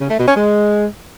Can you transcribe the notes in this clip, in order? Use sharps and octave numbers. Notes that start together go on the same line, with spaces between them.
C#3
A3
B2
C#4
G#3